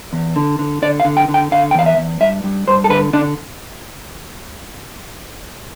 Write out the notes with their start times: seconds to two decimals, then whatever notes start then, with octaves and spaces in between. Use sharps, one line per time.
0.13 E2
0.36 D3
0.59 D3
0.82 D3 D5
1.00 F5
1.05 D3
1.17 G5
1.28 D3
1.34 G5
1.52 D3 F5
1.71 G5
1.74 E2 F5
1.86 E5
1.98 E2
2.20 G2 E5
2.44 G2
2.68 G2 C5
2.84 A4
2.90 D3 B4
3.13 D3 D4